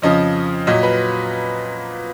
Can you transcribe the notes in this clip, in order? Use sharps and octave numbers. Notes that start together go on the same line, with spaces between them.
F2 C#3 F3 D#5
A#2 F#3 D#5
B4